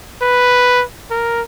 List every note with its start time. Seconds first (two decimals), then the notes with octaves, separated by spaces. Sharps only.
0.22 B4
1.11 A#4